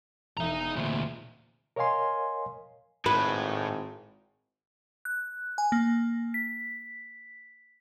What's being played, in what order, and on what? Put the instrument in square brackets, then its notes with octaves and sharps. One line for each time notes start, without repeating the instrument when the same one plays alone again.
[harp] E1 G#3 E5 [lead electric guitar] D#4 A#5
[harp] B3 D#7
[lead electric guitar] D2 A#2 [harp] C5
[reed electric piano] A#4 C#5 D#5 F5 G#5 C6
[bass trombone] G#1 [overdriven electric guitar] A2 [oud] B4
[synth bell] F#6
G#5
A#3
B6